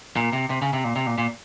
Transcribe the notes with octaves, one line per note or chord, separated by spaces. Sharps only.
A#2
C3
C3
C#3
C3
A#2
C3
A#2
A#2